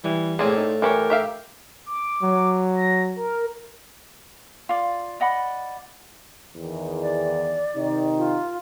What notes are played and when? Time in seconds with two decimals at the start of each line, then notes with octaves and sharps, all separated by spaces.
0.04 E3 G3
0.39 A2 A#3 C4 G#4 D5 A5
0.57 D#4
0.82 E3 G4 A#4 C#5
1.10 G4 E5 F5
1.86 D6
2.23 F#3
2.75 A#6
3.16 A#4
4.69 F4 D5
5.20 D5 D#5 F#5 B5
6.55 E2 D#3
7.02 D5
7.76 C3 D#3 D#4
8.17 F4